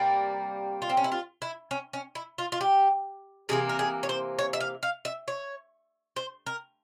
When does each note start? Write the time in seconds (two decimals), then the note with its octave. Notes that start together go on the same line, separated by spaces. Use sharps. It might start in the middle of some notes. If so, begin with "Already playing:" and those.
Already playing: C3 G3 A#3
0.82 F4
0.89 C4
0.97 C#4
1.04 E4
1.12 F4
1.42 E4
1.71 C#4
1.93 C#4
2.15 E4
2.38 F4
2.52 F4
2.61 G4
3.49 C3 E3 A#3 G#4
3.69 A#4
3.79 G#4
4.03 C#5
4.09 C5
4.39 C#5
4.53 E5
4.61 F5
4.83 F5
5.05 E5
5.28 C#5
6.16 C5
6.46 A#4